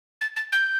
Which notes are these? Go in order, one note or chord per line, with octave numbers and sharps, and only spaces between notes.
A6
A6
G6